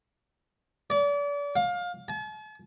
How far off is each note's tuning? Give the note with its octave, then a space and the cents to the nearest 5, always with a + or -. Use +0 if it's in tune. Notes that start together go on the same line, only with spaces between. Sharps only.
D5 -35
F5 +25
A5 -45